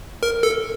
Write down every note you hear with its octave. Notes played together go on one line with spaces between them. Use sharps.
A#4
A4